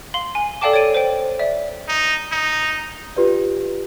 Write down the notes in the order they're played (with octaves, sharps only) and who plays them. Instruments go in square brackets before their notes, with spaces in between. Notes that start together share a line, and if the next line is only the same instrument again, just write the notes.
[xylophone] F5 C6 F#7
G#5
A4 D5 F5 G5 A5 D6
C#5 A6 D7 D#7
C5 G5
D5 E5
[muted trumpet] D#4
D#4
[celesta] F4 G4 B4 D5